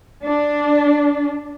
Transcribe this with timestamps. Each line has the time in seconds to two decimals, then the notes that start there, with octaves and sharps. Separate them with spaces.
0.25 D4